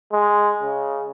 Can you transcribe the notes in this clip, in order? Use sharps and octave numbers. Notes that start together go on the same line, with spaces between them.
G#3
C#3